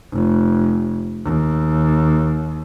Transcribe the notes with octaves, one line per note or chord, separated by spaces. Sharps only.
F1
D#2